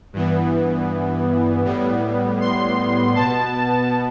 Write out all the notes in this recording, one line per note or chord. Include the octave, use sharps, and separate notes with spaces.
G2 E3 B3
A2 G3 B3
C6
B2 B3 A5